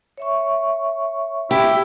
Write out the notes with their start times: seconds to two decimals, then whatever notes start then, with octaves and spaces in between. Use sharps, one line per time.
0.17 C#5 E5 C#6
1.51 E4 G4